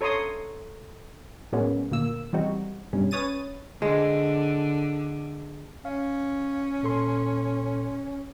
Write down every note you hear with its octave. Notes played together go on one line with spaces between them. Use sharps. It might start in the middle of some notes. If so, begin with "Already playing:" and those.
A4 C#5 A#5 C6 D#6
A2 F#3 G#3 A#3 B3 C#4
D2 A#2 A#3 E6
E3 G3 G#3 C4 D#4 F#4
G2 B2 G3 C#4
C#4 B4 C#5 D#6 A6 D#7
D3 G#3
C#4 F5
A#2 A4 C6